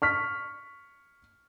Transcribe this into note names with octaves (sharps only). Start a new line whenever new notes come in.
C#6 F6 B6